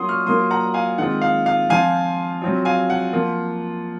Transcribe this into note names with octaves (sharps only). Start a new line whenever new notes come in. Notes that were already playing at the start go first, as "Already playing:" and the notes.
Already playing: F#3 A#3 C#4 F4 F#5 C6 D#6
C#6 F6
F#3 A#3 F4 C6 D#6
F#5 A#5
F5 G#5
D#3 G#3 C4 F4 F#5
F5
F5
F3 C4 F4 F5 G#5
F#3 C4 F4
F5 G#5
F#5
F3 A#3 F4